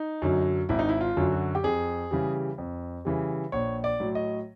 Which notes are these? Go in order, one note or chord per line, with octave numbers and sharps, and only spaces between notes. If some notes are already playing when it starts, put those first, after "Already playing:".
Already playing: D#4
F#2 D3 F#3
G#1 E4
D#4
E4
F4
F#2 D3 F#3
F#4
G4
F2 G#4
C#3 E3 G3
F2
C#3 E3 G3
A#1 C#5
D5
A2 F#3
D#5